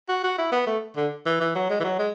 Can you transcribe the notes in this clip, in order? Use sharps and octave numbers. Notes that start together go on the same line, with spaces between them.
F#4
F#4
E4
B3
A3
D3
E3
E3
F#3
G#3
E3
F#3
G#3